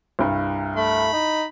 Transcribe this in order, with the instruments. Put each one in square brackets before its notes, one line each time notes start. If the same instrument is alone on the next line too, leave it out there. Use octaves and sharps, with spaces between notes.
[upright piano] C2 G2
[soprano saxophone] A3 [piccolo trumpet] B5
[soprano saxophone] D#4